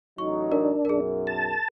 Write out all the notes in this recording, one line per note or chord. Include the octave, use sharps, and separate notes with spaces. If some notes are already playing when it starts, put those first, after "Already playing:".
A1 F#3 D#4 C#6
D4 A#4
B1 F#2 G#4 A#4
A5